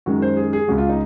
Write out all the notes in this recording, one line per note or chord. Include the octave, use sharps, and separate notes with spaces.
F#2 D#3 G#3 F#4
C5
G#4
G#4
C#2 C#3 G#3 F#4
F4
D#4